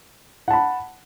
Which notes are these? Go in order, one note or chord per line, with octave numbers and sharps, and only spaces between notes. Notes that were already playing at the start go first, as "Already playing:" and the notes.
F#5 A5 B5